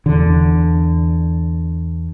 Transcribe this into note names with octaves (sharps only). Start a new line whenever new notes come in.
E2 D3